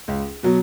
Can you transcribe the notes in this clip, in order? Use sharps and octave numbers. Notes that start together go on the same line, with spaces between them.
C#2
B2 F#3